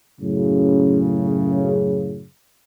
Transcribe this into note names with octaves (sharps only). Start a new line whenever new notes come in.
F#2 A2 C#3